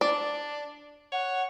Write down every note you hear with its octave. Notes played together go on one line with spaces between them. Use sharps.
D4 D5
C#5 F#5